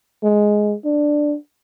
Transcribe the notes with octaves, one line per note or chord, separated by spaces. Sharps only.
G#3
D4